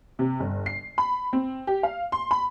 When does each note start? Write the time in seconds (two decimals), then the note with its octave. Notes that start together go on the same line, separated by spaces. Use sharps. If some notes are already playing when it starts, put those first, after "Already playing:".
0.19 C3
0.40 G1
0.66 C7
0.98 B5
1.33 C4
1.67 G4
1.83 F5
2.12 C6
2.31 B5